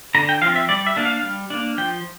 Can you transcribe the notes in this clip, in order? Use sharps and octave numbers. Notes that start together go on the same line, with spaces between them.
D3 A#5
G5
F3 C4 F5
E5
G3 D5
E5
A#3 D4
F5
G3
A#3 D4
F3 G5